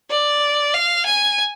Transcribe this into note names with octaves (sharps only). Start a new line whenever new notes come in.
D5
F5
G#5